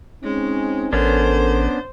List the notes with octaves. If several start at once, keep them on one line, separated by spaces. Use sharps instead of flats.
G#3 C4 C#4 D#4
A1 B3 C#4 D4 A4 A#4 C5